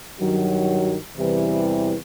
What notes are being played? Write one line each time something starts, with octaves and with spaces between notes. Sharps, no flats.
G2 D#3 F#3
E2 C3 E3 G3